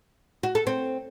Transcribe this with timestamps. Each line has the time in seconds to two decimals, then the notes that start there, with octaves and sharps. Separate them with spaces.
0.43 F#4
0.55 A4
0.67 C4